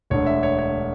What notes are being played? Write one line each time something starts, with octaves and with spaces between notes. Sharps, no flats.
E1 D2 D3 C#5
E5
C#5
C#5